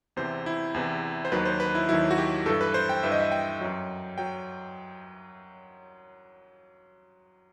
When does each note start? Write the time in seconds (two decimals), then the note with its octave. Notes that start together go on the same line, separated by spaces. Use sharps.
0.16 E2 C3 E3 C5
0.46 E4
0.74 E2 C3 E3
1.25 C5
1.32 D#2 D#3 F#3 B4
1.45 C5
1.60 B4
1.75 E4
1.89 D#2 D#3 F#3 E4
2.11 F#4
2.18 G4
2.46 G2 E3 A4
2.61 B4
2.74 C5
2.89 G5
3.03 G2 E3 E5
3.12 D#5
3.20 E5
3.32 G5
3.61 F#2 F#3
4.18 F#3 G5